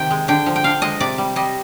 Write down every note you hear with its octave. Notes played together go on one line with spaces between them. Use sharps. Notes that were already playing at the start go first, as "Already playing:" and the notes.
Already playing: C3 D#3 G5
G#3
D3 G5
F3
G5
D3 F5
G#3 D#5
C3 D5
G3
G3 D#5